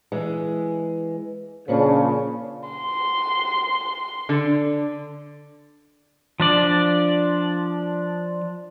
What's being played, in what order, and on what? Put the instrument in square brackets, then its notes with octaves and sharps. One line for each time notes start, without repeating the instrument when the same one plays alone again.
[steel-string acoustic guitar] E3 G#3
[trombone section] A#2 C#3 [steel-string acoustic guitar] F3 C#4 D4
[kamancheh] C6
[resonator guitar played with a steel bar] D3
[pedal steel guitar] F3 D4 D5